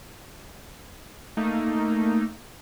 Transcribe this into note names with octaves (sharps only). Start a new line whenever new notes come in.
A3 A#3 D#4